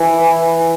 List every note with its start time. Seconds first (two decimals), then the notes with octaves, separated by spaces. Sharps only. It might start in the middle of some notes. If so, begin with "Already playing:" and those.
Already playing: E3